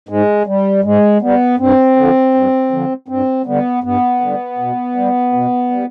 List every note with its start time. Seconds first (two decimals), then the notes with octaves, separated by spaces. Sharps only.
0.09 G#2 G#3
0.47 G3
0.84 G#2 G#3
1.22 G3 B3
1.59 G2 C4
1.96 D3 F3
2.34 G2
2.72 D3 F3
3.08 G2 C4
3.46 D3 G3 B3
3.84 G2 B3
4.21 D3 G3
4.58 B2
4.96 G3
5.33 B2
5.71 G3